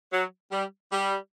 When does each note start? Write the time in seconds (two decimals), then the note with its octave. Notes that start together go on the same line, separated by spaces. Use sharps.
0.12 F#3
0.51 G3
0.91 G3